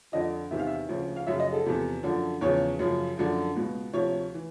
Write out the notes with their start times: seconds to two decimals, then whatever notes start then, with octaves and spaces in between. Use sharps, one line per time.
0.12 F2 D3 F3 D#5
0.51 E2 C3 D#3 E5
0.59 F5
0.67 E5
0.88 D2 C#3 F3
1.16 F5
1.26 F#2 C#3 F3 E5
1.40 D#5
1.53 A4
1.65 E2 C3 F3
2.03 F#2 D3 F3
2.41 E2 C#3 F3 C#5
2.79 F#2 C#3 F3
3.17 F#2 D3 F3
3.56 C#2 B2
3.93 D2 C3 F3 C#5
4.34 E3